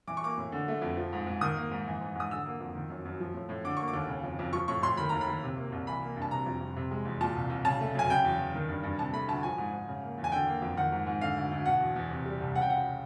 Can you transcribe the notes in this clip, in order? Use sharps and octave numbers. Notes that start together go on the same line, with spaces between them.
E3 D6
C#6
A#3 D6
A2
D3
A3
F2
F3
G#2
G#2
D#3 D#6
A#3
G#2
E3
G#2
G#2 D#6
D3 E6
A#3
F2
D#3
F#2
F#2
F3
A2
A2
D3 D6
A#3 C#6
D6
D#2
C#3
F2
F2
F3 C#6
A2 C#6
A2 C6
D#3 B5
D#2 A#5
B5
D#2
C3
A#3
C2
E3 B5
A#3
G2
A5
C3 A#5
F2
F2
C3
G#3
E2
A#2 A5
C2
C2
C#3 A5
A3
F#2 G#5
C#3 G5
E2
E2
D#3
G2
G2
C3 A5
A3 B5
D2 A5
F3 G#5
G#2
G#2
C#3
A#3
E2
G#5
D3 G5
A#3
F2
D#3 F#5
G#2
G#2
D3 F5
D2
D2
B2 F#5
E2
E2
C3
G3
C2
C#3 F#5
G5
C#2 F#5